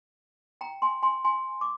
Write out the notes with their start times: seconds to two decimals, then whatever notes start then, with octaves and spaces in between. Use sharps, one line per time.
0.61 G5 A#5
0.82 G#5 C6
1.02 G#5 C6
1.24 G#5 C6
1.61 D6